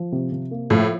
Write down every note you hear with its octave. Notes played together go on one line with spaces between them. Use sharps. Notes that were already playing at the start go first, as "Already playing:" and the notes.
Already playing: F3
C3
C3
A#3
A2 F3